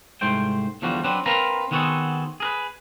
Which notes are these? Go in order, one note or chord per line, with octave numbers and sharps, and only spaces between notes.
C2 G#2 A3 C5 G5
E2 D3 F3 G3 F#4
F#3 C4 D4 B4
C4 A#4 B4 F5 A#5
D#3 B3 C4 F#4 G#4 A4
G#4 A#4 B4